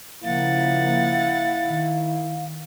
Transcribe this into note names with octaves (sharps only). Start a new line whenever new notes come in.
C#3 F3 A#3 E4 F5 F#5 A6
D#3